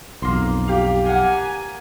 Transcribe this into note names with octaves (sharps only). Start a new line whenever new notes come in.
B1 F2 A#3 C6
G4 F5
A#3 F#5 G#5